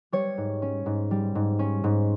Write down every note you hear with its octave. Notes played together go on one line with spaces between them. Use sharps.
G3 C#5
G#2
C#4
G#2
G3
G#2
C#4
G#2